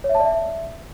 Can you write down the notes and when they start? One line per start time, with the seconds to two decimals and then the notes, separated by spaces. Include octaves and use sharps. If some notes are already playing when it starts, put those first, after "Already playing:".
0.04 C#5
0.09 E5
0.15 A5
0.20 D5
0.25 E5